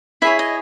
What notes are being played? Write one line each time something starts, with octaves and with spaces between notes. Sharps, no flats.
E4 G#4 C#5 E5
D#5